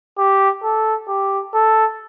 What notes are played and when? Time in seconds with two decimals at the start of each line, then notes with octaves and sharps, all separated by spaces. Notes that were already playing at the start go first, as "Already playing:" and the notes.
0.18 G4
0.63 A4
1.08 G4
1.54 A4